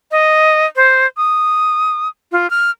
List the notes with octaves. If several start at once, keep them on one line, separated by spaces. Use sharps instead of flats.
D#5
C5
D#6
F4
F6